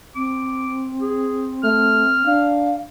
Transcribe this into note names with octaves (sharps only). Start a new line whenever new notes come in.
C4 D6
G#4
A3 F6
D4 F5